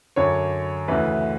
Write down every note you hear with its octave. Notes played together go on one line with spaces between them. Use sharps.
F#2 D3 C#5
D2 C#3 E3 B4